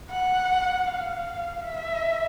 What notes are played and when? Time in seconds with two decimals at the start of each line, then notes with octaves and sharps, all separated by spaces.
0.10 F#5
0.87 F5
1.64 E5